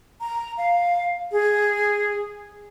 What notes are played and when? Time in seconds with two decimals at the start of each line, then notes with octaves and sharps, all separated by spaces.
0.21 A#5
0.58 F5
1.32 G#4